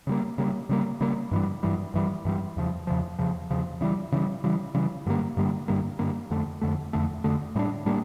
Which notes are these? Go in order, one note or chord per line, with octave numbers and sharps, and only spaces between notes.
C#3 G3 A#3
C#3 G3 A#3
C#3 G3 A#3
C#3 G3 A#3
G2 E3 G3
G2 E3 G3
G2 E3 G3
G2 E3 G3
E2 C#3 F3
E2 C#3 F3
E2 C#3 F3
E2 C#3 F3
C#3 E3 G3
C#3 E3 G3
C#3 E3 G3
C#3 E3 G3
G2 D3 G3 A#3
G2 D3 G3 A#3
G2 D3 G3 A#3
G2 D3 G3 A#3
F2 D3 A3
F2 D3 A3
F2 D3 A3
F2 D3 A3
A2 G3 A#3 D4
A2 G3 A#3 D4